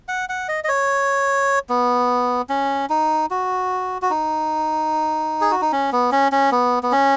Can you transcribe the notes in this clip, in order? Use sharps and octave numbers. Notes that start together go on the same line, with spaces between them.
F#5
F#5
D#5
D#5
C#5
B3
C#4
D#4
F#4
F#4
D#4
G#4
F#4
D#4
C#4
B3
C#4
C#4
B3
B3
C#4